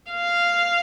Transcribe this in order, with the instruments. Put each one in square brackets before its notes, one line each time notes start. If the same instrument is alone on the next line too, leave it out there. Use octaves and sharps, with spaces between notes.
[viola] F5